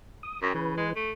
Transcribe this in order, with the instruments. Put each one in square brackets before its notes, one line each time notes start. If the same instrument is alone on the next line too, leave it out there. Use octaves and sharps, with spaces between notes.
[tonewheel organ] D#6
[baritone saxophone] F#2 [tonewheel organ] G5 A#5
[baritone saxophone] C#3 [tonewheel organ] E3 B4
[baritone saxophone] G#3
A3